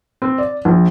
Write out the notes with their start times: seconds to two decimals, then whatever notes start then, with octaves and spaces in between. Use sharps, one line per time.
0.22 C4
0.38 D5
0.65 A#1